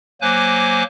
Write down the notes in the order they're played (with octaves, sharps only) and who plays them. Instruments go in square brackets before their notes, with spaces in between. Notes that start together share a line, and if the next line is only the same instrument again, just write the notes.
[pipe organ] F#3 A#3 C5 G#5 D6 F#6